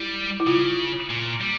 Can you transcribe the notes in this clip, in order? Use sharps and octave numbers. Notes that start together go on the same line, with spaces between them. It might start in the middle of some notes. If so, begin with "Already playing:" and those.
Already playing: G3 E4
E4
C#3 F4
A#2
G3